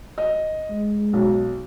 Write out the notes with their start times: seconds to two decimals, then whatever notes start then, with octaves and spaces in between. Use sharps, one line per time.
0.18 D#5
0.70 G#3
1.13 B1